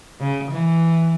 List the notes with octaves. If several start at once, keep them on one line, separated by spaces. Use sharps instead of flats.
C#3
E3